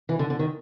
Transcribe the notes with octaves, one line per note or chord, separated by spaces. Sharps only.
E3
D3
D3
D#3